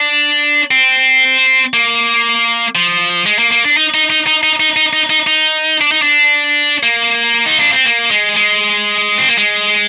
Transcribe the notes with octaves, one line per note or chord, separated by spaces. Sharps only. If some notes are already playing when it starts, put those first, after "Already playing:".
Already playing: D4
C4
A#3
F3
G#3
A#3
A#3
D4
D#4
D#4
D#4
D#4
D#4
D#4
D#4
D#4
D#4
D#4
D4
D#4
D4
A#3
D#4
D4
C4
A#3
G#3
G#3
C4
A#3
G#3